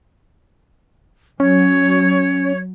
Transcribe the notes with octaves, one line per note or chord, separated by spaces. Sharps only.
F#3 C#4 C#5